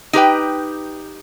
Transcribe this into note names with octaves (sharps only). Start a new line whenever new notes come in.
D#4 G4 B4 G5